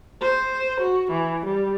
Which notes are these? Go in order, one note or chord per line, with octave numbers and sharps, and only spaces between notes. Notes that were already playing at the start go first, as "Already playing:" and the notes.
C5
F#4
E3
G3